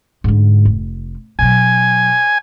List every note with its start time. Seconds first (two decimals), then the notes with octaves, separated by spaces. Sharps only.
0.24 G#2 D3
0.65 F1
1.39 B2 F#3 G#5